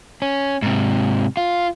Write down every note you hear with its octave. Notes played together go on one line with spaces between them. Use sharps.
C#4
G#2 C3
F4